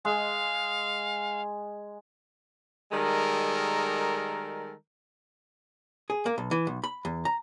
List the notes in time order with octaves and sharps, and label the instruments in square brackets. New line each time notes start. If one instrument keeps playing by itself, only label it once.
[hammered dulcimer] G#3 [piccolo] F5
[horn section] D#3 G3 G#3 A4 A#4
[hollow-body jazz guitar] G#4
A#3
B1
E3
B1
B5
E2
A#5